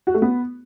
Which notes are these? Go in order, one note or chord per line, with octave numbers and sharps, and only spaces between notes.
F#4
A3
B3